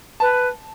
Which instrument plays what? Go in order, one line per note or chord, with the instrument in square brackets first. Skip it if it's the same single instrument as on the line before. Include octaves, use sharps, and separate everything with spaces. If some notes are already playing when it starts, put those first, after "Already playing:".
[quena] B4 [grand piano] A5